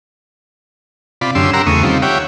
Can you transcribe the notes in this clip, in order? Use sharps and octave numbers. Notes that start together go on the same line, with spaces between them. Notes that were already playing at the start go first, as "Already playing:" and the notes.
C3 F4 D5 B5
F#2 D3 C#4 G4 C6 E6
G4 A#4 F#5 A#5 C6 E6
E2 C#3 A3 C#6 D#6
D#3 G3 C4 F4
G4 C#5 E5 F#5 G5